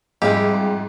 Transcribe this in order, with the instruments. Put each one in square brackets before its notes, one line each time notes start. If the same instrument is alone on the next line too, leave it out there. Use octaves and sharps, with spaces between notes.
[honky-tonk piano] F2 G#2 [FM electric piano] G3 F5 G5 [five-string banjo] G#3 E4 G4